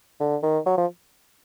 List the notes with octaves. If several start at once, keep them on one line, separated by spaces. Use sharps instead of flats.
D3
D#3
F#3
F3